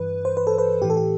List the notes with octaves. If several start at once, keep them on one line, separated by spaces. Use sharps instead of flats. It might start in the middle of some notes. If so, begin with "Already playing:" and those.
Already playing: G2 E3 B4
C5
B4
A4
B4
A2 E3 G4
A4
G4